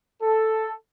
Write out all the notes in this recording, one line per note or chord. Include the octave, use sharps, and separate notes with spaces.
A4